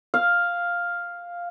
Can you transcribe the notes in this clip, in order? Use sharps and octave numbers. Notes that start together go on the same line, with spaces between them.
F5